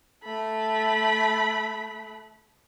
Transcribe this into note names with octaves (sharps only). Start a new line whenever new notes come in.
A3 B5